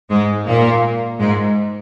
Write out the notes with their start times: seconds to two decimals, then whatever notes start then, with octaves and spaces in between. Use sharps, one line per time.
0.10 G#2 G#3
0.47 A#2 A#3
1.19 G#2 G#3